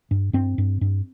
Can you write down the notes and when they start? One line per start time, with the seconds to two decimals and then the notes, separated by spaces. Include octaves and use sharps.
0.11 G2
0.33 G2 C4
0.58 G2
0.81 G2